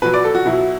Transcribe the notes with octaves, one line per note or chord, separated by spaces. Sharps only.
B2 F#3 B4
D5
A4
F#4
B2 F#3 E4